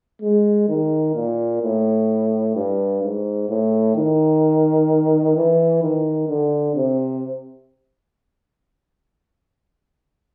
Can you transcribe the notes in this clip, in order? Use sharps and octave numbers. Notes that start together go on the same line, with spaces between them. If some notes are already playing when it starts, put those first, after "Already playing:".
G#3
D#3
A#2
A2
G2
G#2
A2
D#3
E3
D#3
D3
C3